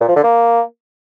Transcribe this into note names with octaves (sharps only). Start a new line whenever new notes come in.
A#2
F3
D3
A#3